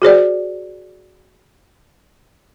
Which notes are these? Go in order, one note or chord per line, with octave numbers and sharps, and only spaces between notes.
F#4 G#4 C5 D5